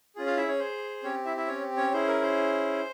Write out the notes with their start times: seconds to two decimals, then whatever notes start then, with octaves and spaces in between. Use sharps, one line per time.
0.16 C#4 F4 G#4
0.26 F4 F5
0.37 E4 E5
0.48 C#4 C#5
0.59 C5
1.03 C4 C#4 G4 C#5
1.25 E4 E5
1.37 E4 E5
1.47 C#4 C#5
1.77 C#4 C#5
1.92 C#4 E4 G#4 C5
2.07 A#4
2.22 C5